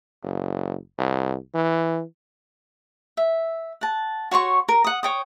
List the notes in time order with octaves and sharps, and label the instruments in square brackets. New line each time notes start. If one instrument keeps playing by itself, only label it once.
[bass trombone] F#1
C2
E3
[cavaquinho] E5
F#5 A5
F#4 C#5 C6 C#6
A#4
F#5 D#6
C#5 G5 D#6